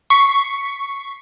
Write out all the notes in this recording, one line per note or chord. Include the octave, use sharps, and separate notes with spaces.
C#6 B6 C7